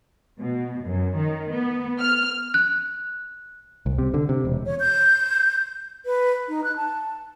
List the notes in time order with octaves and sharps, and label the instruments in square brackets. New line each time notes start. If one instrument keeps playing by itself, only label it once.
[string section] B2
F#2
D#3
B3
F6
[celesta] F#6
[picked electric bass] C2
C3
D3
C3
E1
[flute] C#5
G6
B4
D#4
F#6
A5